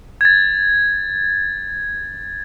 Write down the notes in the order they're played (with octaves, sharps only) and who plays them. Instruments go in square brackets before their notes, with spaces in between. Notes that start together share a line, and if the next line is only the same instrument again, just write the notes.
[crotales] G#6 A6